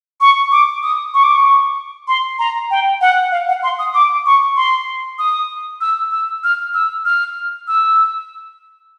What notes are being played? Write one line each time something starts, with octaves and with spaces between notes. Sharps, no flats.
C#6
D6
D#6
C#6
D6
C#6
C6
A#5
G5
F#5
F5
F#5
C6
D#6
D6
C#6
C6
D#6
E6
E6
F6
E6
F6
E6